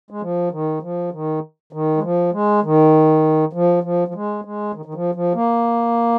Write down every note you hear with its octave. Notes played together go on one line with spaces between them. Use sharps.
G#3
F3
D#3
F3
D#3
D#3
G#3
F3
G#3
D#3
F3
F3
F3
G#3
G#3
D#3
D#3
F3
F3
A#3